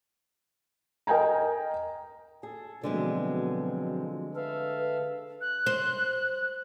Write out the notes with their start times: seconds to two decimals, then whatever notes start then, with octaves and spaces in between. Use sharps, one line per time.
1.07 A#4 D#5 G5 G#5 A#5
2.43 G#4 A4
2.83 B2 D3 F3 F#3 G#3 A3 C4
4.36 A4 B4 E5 F5
5.41 F#6
5.66 C5